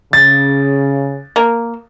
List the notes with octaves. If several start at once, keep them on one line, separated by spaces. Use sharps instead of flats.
C#3 A6
A#3